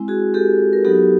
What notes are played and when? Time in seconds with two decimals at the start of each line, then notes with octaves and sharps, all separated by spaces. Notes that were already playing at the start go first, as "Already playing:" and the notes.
Already playing: G#3 C4 E4
0.08 F#4 G#4
0.34 G4 A4
0.73 A#4
0.85 F#3 B3 D#4 F#4 G4 A4